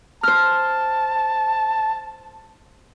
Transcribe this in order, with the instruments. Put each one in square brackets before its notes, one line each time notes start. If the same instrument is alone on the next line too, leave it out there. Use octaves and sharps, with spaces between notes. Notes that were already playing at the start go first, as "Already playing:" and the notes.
[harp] C5 F6 [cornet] A5